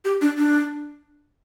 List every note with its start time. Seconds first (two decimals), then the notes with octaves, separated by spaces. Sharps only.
0.05 G4
0.21 D4
0.38 D4